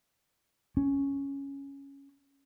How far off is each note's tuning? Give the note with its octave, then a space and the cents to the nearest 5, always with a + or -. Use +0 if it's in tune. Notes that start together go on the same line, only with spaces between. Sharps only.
C#4 +0